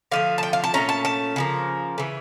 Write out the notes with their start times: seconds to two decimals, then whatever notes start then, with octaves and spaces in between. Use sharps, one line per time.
0.12 D3 F3 A3 F5
0.38 A5
0.43 G5
0.53 F5
0.64 A5
0.74 A#2 A3 C#4 A#5
0.89 A5
1.05 A5
1.36 C#3 F3 A#3
1.98 C#3 E3